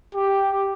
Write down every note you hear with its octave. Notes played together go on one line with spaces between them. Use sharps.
G4